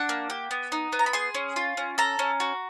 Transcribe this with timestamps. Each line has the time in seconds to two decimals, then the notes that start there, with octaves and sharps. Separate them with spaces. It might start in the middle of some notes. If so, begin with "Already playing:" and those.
Already playing: D4 F#5
0.09 A#3
0.30 G4
0.51 B3
0.72 D#4
0.93 B3
0.99 A#5
1.06 B5
1.13 G#4 C6
1.35 C#4
1.56 F4
1.77 C#4
1.98 A4 A#5
2.19 C#4
2.40 F#4